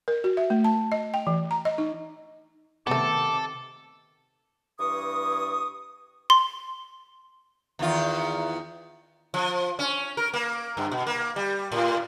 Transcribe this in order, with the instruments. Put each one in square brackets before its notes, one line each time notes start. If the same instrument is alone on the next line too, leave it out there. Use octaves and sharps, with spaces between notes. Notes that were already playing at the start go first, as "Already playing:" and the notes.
[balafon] A#4
F#4
E5
A3
A5
D#5
G5
E3
A#5
D#5
D#4
[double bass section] C3 D#3 [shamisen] A3 B3 [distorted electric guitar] A4 [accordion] D6
[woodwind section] G2 E3 C#6 D#6
[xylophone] C6
[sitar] E2 D#3 F4
F3
C#4
A#4
A#3
G2
B2
A#3
G3
A2